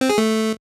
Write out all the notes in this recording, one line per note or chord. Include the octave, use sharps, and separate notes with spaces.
C4
G#4
A3